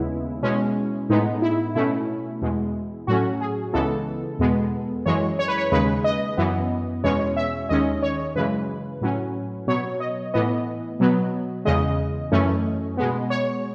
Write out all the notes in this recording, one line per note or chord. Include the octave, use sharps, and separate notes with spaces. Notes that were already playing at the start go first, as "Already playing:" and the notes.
Already playing: D#2 C#3 G#3 B3 E4
B2 G#3 C#4
A2 G#3 B3 D#4
E4
B2 A3 C#4 E4
E2 B2 G#3
A2 F#3 A3 C#4 F#4
G#4
C#2 C#3 E3 G#3 B3 A4
E2 B2 G#3 B3
F#2 E3 G#3 C#5
C#5
B4
C#5
D#2 C#3 G#3 B4
D#5
F#2 E3 B3
E2 B2 G#3 C#4 C#5
E5
D#2 D#3 G#3 C#4 D#5
C#5
F#2 C#3 E3 G#3 B4
A2 F#3 C#4
B2 F#3 B3 C#5
D#5
A2 E3 B3 D#5
B2 F#3 B3
E2 C#3 G#3 D#5
F#2 E3 A3 C#4
B2 G#3 B3
C#5